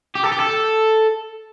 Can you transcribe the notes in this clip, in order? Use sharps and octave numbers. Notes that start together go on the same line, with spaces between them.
G4
A4
G4
A4